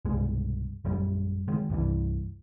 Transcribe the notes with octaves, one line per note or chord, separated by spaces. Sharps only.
C2 G2 B2 G#3
A#1 F#2 G3
D#3 G#3
C2 G2 C3 E3